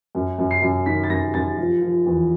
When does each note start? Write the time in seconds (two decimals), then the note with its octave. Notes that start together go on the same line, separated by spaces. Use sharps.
0.15 F#2
0.38 F#2
0.51 C7
0.62 F#2
0.86 D#3 B6
1.04 A6
1.10 F#2 A#6
1.34 F#2 A6
1.58 F3
1.82 F3
2.06 E2